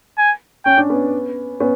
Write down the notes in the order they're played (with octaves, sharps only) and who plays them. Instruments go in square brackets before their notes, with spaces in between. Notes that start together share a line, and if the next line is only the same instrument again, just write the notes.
[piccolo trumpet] G#5
[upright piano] C#4 [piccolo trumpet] G5
[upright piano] D4
B3 C#4
B3 C#4